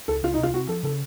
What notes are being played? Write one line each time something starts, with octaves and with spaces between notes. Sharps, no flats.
C#2 A4
C#2 F4
D#4
C3
F4
C4 F#4
F3 A4
C#3 A4